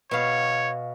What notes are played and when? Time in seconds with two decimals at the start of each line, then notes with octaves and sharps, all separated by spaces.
0.11 B2 C#5 F5